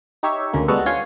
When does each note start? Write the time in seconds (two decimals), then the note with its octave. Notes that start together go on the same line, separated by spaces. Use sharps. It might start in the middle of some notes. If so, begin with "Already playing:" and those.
0.23 D#4 G4 C#5 E5 C#6
0.53 D2 C#3 G#3 A#3
0.68 G3 G#3 B3 F#4 A4
0.86 C#4 F4 C#5 G#5 C6